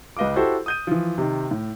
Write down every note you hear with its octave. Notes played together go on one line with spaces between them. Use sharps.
C#2 B4 D#5 F5 D6
E4 F#4 G4 A4 C5
D#6 G6 D#7
E3 F3
C3 D#3
A2